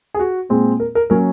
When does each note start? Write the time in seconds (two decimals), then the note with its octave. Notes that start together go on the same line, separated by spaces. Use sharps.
0.14 G#4
0.19 F#4
0.49 A#2 G#3 C4
0.80 A#4
0.95 A#4
1.10 F#3 A#3 C#4 A#4